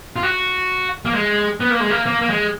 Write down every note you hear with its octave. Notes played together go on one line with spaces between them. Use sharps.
F4
F#4
A#3
G#3
B3
A#3
G#3
A#3
A#3
A#3
G#3